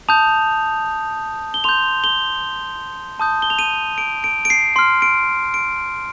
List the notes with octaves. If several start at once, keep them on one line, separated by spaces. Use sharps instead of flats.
A5 D#6 G6 F7
G7
C6 G6 F7
G7
A5 D#6 G6
G7
F7
D#7
D7
D7
D7
C7
C6 F6 C7
D7
D7